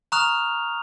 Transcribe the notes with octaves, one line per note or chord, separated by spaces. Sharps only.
A#5 C#6 D#6 F6 F#6 F7